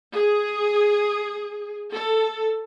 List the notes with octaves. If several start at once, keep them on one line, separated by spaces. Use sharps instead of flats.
G#4
A4